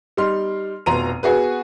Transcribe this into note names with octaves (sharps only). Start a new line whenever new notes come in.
G3 D#4 C6 F6
F1 B2 A#5 C6 D#7
B3 F#4 G#4 B4